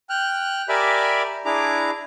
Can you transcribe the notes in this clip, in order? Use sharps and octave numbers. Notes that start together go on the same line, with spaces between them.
G5 F6 F#6
G4 A#4 D5 E5 G#5 B5
D4 E4 G#4 A#5 D6